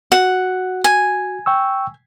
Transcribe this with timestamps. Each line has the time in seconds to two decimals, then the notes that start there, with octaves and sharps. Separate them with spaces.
0.12 F#4 F#5
0.84 G#5
1.46 G5 C#6 E6